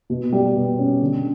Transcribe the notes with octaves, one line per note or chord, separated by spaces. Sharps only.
B2
G3
B2
C#4
D3